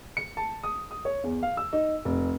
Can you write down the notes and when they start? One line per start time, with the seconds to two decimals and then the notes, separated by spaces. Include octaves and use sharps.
0.17 C#7
0.37 A5
0.64 D#6
0.91 D#6
1.05 C#5
1.24 E2
1.43 F5
1.57 E6
1.73 D#4
2.05 F1